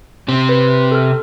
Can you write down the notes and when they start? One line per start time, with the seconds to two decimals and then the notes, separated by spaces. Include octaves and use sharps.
0.28 C3 C4
0.49 B4
0.92 A4 F6